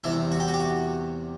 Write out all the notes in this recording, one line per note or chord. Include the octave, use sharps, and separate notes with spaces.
E2 C3 G3 E4
F#4
G4
F#4
G4
F#4